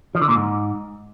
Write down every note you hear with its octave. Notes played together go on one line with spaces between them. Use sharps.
F3
D3
A#2
G#2